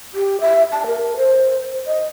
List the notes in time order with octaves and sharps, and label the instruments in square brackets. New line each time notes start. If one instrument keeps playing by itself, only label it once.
[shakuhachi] G4
E5
A5
A#4
C5
D#5